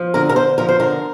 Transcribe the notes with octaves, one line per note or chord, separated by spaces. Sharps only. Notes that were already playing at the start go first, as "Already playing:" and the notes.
Already playing: F3
D3 A#4
A#4
D3 C5
F3 A#4
C5
D3 A#4